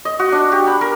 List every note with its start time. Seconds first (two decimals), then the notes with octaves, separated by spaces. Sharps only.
0.05 D#5
0.19 F#4
0.32 D4
0.52 G4
0.67 B5
0.81 A#4